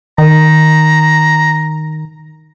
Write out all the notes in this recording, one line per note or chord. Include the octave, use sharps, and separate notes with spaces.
D#3 A#5